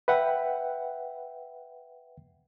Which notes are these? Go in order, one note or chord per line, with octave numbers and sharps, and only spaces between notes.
B4 E5 F#5 G5